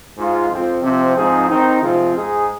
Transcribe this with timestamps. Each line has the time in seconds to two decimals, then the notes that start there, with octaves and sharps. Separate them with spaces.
0.17 G#2 G#3 F4 G#4
0.50 F2 F3 C4
0.83 C3 F3 C4
1.16 G#2 F3 C4 D#4 G#4
1.49 D#3 C4 D#4
1.81 C3 F3 G#3 C4 F4
2.15 G#2 G#3 D#4 G#4